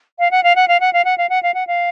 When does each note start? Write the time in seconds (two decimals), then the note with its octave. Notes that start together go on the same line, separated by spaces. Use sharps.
0.19 F5
0.31 F#5
0.43 F5
0.56 F#5
0.68 F5
0.80 F#5
0.93 F5
1.05 F#5
1.18 F5
1.29 F#5
1.43 F5
1.54 F#5
1.67 F5